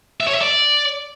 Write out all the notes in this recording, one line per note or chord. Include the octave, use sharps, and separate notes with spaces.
E5
C#5
E5
D5